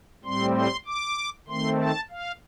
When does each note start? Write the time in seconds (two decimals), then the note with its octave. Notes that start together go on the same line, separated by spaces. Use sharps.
0.24 A2 G3 C4 C6
0.55 C6
0.86 D6
1.48 D#3 A3 C4 C6
1.79 A5
2.10 F5